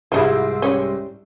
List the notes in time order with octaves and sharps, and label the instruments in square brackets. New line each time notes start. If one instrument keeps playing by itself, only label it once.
[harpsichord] C2 G#2 C3 [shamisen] F3 D#4 E4
[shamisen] G3 C#4